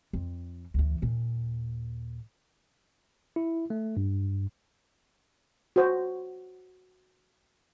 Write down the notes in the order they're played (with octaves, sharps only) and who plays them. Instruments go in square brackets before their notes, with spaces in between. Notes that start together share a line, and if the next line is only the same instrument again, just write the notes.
[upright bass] F2
D2 E3
D#2 A#2
[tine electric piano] E4
A3
G2
[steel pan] F#4 C5